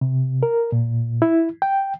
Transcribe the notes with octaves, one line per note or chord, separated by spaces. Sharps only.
C3
A#4
A#2
E4
G5